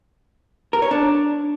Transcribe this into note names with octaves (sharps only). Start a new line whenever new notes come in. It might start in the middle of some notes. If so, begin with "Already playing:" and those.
A#4
C#5
D4